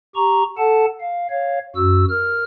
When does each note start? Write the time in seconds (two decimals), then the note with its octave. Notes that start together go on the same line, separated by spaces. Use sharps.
0.15 G4 A#5 C#6
0.58 A4 F#5 A5
1.01 F5
1.30 C#5 F5
1.76 F#2 F#4 E6
2.09 A#4 F6